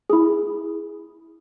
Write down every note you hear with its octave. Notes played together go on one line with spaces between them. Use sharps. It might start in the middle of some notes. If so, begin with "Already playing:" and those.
E4 G#4